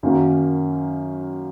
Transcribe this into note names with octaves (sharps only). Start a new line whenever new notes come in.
F#2 D#3 F#3 A#3